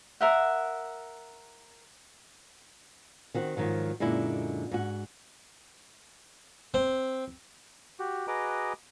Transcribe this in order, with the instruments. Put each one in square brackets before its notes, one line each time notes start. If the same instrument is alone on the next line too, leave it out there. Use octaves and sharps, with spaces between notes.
[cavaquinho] A#4 E5 F#5
[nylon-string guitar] D#3 C4 F#4
G#2 D#3 F3 F#3
F#2 A#2 D3 G#3 E4
G#2 F#4
[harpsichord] C4
[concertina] F#4 G4
F#4 G#4 B4 D#5 A#5 D6